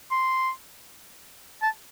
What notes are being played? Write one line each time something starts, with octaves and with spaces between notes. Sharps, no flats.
C6
A5